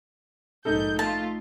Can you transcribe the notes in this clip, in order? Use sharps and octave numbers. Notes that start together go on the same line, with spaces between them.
A#1 G#2 D#4 A4 G6
A3 F4 A5